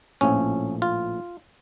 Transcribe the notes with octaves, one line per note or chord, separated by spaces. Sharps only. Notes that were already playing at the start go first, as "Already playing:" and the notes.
A#1 A2 F3 C#4
F4